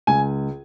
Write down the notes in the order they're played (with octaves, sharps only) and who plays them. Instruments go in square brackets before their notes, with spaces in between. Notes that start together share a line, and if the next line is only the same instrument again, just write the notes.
[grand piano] C#2 G#5